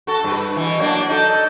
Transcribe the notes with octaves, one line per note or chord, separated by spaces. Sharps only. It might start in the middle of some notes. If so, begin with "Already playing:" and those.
F#4 A4
G2 B4
B2 E3
F#3 A#3 D4
D#4 A4